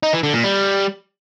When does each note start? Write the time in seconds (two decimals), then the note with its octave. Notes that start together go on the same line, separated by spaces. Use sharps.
0.03 D#4
0.13 E3
0.23 D3
0.34 A#2
0.44 G3